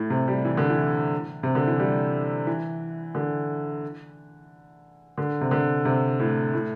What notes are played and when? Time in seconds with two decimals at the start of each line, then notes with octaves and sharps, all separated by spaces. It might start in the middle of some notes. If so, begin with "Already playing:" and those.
Already playing: A2
0.10 C3
0.28 G3
0.45 E3
0.57 D3
0.70 E3
1.43 C3
1.55 D3
1.68 E3
1.79 G3
2.47 E3
3.15 D3
5.18 D3
5.41 C3
5.51 D3
5.85 C3
6.19 A2
6.53 A2